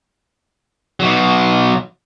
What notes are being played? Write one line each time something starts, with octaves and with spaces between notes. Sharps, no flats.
B2 F#3